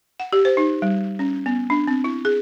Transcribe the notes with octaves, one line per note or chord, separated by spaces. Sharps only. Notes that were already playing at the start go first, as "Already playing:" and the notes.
F#5
G4
C5
D#4
G3
C#4
B3
D4
C4
E4
G#4